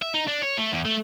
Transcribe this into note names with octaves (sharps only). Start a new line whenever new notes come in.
E5
D#4
D4
C#5
A3
E2
A3